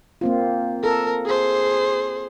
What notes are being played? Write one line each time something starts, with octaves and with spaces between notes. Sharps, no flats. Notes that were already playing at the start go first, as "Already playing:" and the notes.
A#3 C4 F4
A4 A#4
G#4 C5